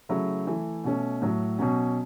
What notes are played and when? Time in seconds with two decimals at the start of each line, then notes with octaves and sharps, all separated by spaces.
0.09 C#3 F#3 A3 E4
0.47 E3 A3 E4
0.84 B2 A3 C#4
1.22 A2 F#3 A3
1.59 B2 F#3 C#4